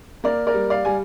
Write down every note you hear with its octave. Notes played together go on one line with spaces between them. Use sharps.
A#3 A#4 D5
A#4 D5
G3
D5 F5
G3 G#5